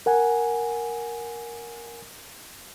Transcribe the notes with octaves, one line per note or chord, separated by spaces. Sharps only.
A#4 F#5 G#5